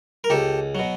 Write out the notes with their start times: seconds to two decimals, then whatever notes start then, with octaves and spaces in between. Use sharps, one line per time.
0.24 A#4
0.30 C#2 G4 A4
0.75 B2 F#3